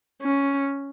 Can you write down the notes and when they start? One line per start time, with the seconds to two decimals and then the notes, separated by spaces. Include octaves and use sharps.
0.22 C#4